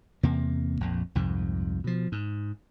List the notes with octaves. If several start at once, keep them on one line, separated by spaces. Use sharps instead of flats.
E2 C3 A#3
A#1 F2
C2 F2 G#2
B2 F3
G#2